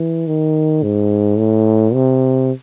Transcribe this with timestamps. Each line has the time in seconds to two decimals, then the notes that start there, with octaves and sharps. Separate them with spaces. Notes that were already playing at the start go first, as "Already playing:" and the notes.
Already playing: E3
0.27 D#3
0.83 G#2
1.38 A2
1.94 C3